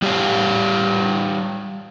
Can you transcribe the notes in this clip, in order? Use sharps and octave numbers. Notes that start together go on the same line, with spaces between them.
G3 G4 C#5 F5